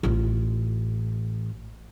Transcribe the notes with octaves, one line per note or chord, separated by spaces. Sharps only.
A1 F4